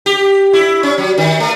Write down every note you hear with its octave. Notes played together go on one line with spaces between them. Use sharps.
G4
E4
C#4
F#3
D#3
A3